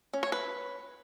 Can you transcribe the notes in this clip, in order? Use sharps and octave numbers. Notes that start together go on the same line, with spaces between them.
C#4
C#5
B4